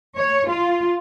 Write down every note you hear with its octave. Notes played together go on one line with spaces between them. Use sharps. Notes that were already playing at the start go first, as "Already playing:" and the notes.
C#5
F4